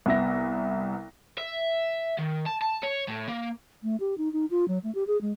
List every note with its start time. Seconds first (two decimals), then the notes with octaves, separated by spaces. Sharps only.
0.06 C2 B3 E5 A#6
1.38 E5
2.19 D#3
2.46 A5
2.62 A5
2.83 C#5
3.08 A2
3.29 A#3
3.83 A3
4.00 G4
4.18 D#4
4.33 D#4
4.51 F4
4.68 F#3
4.84 A3
4.95 G4
5.07 G#4
5.21 G#3